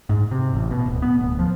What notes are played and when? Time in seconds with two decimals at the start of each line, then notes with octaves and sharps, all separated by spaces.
0.09 G#2
0.31 C3
0.54 A1
0.71 B2
0.86 D1
1.02 B3
1.19 D1
1.39 F3